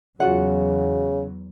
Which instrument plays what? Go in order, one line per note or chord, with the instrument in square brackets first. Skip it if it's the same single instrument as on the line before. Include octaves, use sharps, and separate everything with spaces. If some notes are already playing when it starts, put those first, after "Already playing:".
[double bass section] E2 F#3 [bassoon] C#3 [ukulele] F4 F#4 F#5